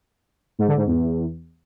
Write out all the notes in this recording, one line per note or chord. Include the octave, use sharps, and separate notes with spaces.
G#2
D3
G#2
E2